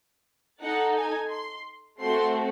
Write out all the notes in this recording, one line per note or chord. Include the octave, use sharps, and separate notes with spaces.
D#4 A4 F#5
G#5
C6
A3 C4 F#4 A4 C6